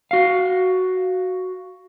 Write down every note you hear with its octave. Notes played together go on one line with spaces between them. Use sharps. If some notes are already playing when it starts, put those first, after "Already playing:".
F#4 F5